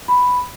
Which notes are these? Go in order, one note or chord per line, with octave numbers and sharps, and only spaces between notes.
B5